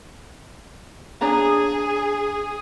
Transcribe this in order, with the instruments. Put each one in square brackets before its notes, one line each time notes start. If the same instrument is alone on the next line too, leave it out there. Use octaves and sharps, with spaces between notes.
[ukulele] D4 C#5 A#5 [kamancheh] G#4